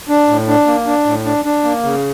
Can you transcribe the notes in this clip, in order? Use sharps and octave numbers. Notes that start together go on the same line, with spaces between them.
D4
A2
D4
A#3
D4
A2
D4
D4
A#3
C#3